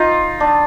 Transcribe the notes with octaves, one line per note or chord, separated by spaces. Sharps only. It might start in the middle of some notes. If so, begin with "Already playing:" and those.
Already playing: D#4 F4
D4